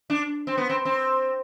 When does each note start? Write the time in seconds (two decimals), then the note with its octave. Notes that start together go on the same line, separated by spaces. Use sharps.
0.10 D4
0.47 C4
0.57 B3
0.70 C4
0.85 C4